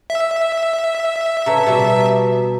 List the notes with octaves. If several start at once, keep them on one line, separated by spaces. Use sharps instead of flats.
E5
C#3 B4 A5 A#5
B2 G3 B3